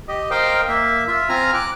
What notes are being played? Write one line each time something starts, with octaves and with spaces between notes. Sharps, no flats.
G4 D#5
A#4 C5 D#5 F5 G5
A#3 E5
F4 E5
C4 F4 G#5 A#5 F6
D6 F#6